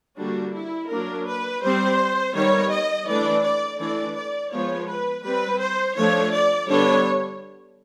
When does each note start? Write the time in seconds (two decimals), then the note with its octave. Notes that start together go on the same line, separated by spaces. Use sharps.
0.18 D3 G3 A#3 D4 F#4
0.54 E4
0.90 F#3 A#3 D4 A#4
1.26 B4
1.63 G3 C4 C5
2.35 D#3 G3 B3 C#5
2.71 D#5
3.07 E3 A3 D4 D5
3.43 D5
3.79 E3 A3 D4 D5
4.15 D5
4.51 F3 G#3 B3 C#5
4.88 B4
5.24 G3 C4 B4
5.60 C5
5.96 F3 A3 D4 C#5
6.32 D5
6.69 D3 G3 B3 D4 C#5